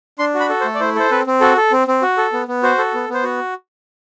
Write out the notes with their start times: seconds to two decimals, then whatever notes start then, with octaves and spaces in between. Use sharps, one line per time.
0.19 D4 C6
0.35 F#4
0.40 B5
0.49 A4
0.61 C5
0.65 A3
0.75 D5
0.80 E4 C5
0.95 A4 C5
1.11 C4 B4
1.27 C4
1.41 F#4 A4
1.57 A4
1.72 C4
1.87 C4
2.02 F#4
2.18 A4
2.33 B3
2.48 B3
2.63 F#4 C5
2.78 A4
2.94 B3
3.09 B3 C5
3.23 F#4